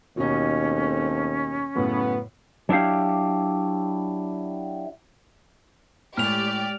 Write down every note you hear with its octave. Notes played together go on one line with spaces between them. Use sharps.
D#2 B2 C#4 D#4
A3 C4
F#2 A2 C#3 B3
F#3 D4 E4 G4 F5
A2 G#3 G4 D5 F6 F7